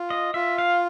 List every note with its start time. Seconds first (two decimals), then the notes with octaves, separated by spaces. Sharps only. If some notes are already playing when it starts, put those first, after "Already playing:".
Already playing: F4
0.10 D#5
0.34 F4 E5
0.58 F5